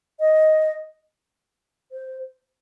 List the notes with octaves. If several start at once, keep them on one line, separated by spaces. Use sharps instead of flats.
D#5
C5